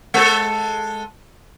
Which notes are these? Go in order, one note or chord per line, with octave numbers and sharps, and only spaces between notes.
G#3 A4